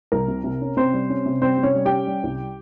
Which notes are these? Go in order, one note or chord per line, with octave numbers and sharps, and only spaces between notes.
C2 A#4
C3
C3
C#4
C3 C4 C5
G3
C#4
C3
G3 C4 C5
C3
C#4 C#5
G3
G4 G5
C#4
G3
C2